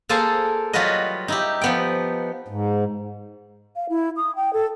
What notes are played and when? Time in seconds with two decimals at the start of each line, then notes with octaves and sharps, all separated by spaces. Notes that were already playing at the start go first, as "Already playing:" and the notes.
0.09 A#3 G#4 A4 C5 G#5 A5
0.73 F#3 G3 F4 F#4 B4 D#5
1.28 D#4 E4 G4
1.62 F3 B3 G5
2.48 G#2
3.76 F5
3.89 E4
4.17 D#6
4.36 G5
4.53 A4